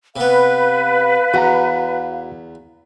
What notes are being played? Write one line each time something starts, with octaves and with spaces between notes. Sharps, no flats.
C3 B3 B4 F5
E2 F#4 F#5 A#5